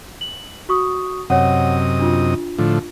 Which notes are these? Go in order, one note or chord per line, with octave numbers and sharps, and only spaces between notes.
F#7
F#4 C#6 D#6
F#2 C3 C#5 D#5 F#5
D4 F4
A2 D3 F3